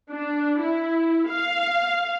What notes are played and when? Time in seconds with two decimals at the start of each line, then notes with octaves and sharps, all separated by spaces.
0.11 D4
0.61 E4
1.29 F5